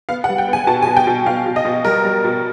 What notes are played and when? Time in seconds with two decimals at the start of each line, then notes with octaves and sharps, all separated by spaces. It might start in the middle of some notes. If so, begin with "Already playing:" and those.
0.09 B3 F5
0.24 F#5
0.29 G3
0.38 G5
0.48 B3
0.53 G#5
0.67 B2 A5
0.82 G#5
0.87 B2
0.97 G5
1.07 B2
1.26 B2 F5
1.46 B2
1.56 D#5
1.65 B2
1.85 G3 A#4
2.04 G3
2.25 B2